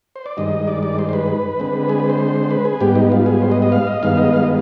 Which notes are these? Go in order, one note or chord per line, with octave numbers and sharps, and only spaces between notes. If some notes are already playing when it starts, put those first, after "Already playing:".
C5
D5
G2 D#3 G#3 D#5
D5
D5
C5
C5
B4
D3 G#3 C4
G#4
B4
C5
B4
G#4
G#2 G3 B3 G4
D#4
F4
G#4
C5
D#5
D#5
F5
D#5
G2 D#3 G#3 B3 F5
D#5
F5
D#5